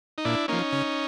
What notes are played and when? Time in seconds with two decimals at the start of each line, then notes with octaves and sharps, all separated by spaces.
0.18 D#4
0.25 A#2 D4 E4
0.48 F3 A#3 C#4 D#4
0.72 C#3